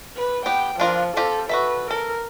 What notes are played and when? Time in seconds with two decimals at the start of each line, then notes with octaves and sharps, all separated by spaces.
0.17 B4
0.46 B3 G4 G5
0.80 F3 D4 F4 A#4
1.17 C4 F4 G4 A4
1.49 F#4 A4 B4 E5
1.91 A4 A#4